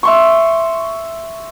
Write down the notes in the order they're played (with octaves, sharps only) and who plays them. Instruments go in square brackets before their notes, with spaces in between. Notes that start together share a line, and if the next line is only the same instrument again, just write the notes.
[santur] E5 C6 C#6